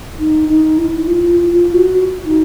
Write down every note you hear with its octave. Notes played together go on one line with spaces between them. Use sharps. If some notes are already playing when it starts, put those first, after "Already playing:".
D#4
D#4
E4
F4
F4
F4
F#4
D#4